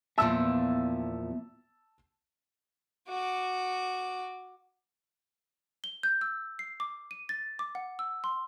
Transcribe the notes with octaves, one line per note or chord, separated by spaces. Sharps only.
E2 A#2 F3 B3 E5 A5 E6
F#4 D6
G7
G6
E6
C7
D6
D#7
A6
D6
F#5
E6
C6